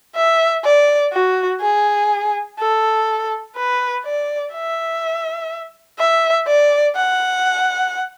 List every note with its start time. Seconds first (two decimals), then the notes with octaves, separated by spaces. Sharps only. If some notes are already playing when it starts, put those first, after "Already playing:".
0.16 E5
0.65 D5
1.13 F#4
1.61 G#4
2.60 A4
3.56 B4
4.05 D5
4.54 E5
5.99 E5
6.47 D5
6.96 F#5